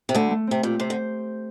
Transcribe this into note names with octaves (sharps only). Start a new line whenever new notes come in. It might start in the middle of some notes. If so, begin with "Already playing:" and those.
C3
D2 D3 A3
A3
C3 C4
A#2 G4
C3 C5
D3